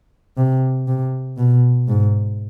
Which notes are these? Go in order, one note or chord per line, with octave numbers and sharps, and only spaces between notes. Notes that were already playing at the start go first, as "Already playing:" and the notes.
C3
C3
B2
G#2